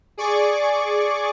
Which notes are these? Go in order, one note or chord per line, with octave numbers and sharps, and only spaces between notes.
G#4 D5 C#6 D6